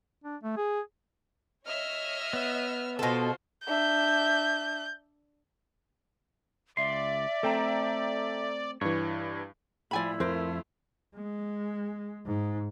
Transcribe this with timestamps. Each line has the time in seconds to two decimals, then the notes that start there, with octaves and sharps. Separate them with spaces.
0.24 D4
0.43 A3
0.57 G#4
1.67 C#5 D#5 E5 E6 F6
2.33 B3
2.99 B2 F4 F#4 A4 C5
3.67 D4 E5 G6
6.77 C#2 D5 E5 C6
7.43 A3 C4 A4 G5 A#5
8.81 G2 E3 C#5
9.91 A2 F3 G3 E4 D5 G#5 B5
10.20 F2 A3 F4 A#4 C5
11.16 G#3
12.26 G#2